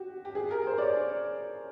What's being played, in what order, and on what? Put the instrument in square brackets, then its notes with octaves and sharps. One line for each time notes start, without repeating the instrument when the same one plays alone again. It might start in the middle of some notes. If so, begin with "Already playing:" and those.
Already playing: [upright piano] F#4 G4
G4
G#4
A#4
C5
D5
C#5